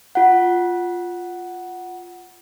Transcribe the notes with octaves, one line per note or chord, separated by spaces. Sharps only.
F4 F#5